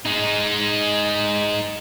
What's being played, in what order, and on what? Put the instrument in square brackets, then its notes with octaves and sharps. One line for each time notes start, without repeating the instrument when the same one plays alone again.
[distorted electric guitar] G#3 D#4